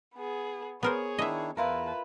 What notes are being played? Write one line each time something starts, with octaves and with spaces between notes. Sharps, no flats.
B3 G#4
B3 G#4 A#4 C5 C#5
D#3 D4 E4 D#5 E5
E2 E4 F4 A#4 B4 A5